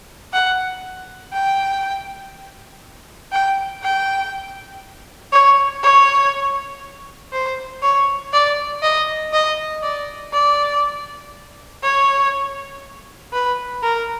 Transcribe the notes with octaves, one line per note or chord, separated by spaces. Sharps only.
F#5
G5
G5
G5
C#5
C#5
C5
C#5
D5
D#5
D#5
D5
D5
C#5
B4
A#4